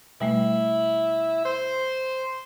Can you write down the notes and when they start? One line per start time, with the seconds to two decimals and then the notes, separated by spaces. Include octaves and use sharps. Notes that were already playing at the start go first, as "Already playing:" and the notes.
0.20 B2 G3 A3 E4
1.45 C5